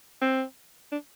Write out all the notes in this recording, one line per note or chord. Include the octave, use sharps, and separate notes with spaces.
C4
D4